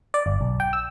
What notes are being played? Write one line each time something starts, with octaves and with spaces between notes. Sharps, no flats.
D5
G1
B1
G5
E6